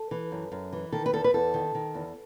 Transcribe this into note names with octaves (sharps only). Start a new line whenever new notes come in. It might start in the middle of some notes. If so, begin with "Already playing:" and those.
Already playing: A4
E3
F#2
F#2
E3
D#3 A4
B4
E2 A4
B4
E2 A4
D#3
D#3
E2